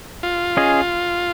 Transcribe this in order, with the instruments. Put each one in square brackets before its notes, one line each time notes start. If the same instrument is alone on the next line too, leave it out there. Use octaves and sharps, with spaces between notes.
[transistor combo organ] F4
[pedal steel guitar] C#4 G#4 D#5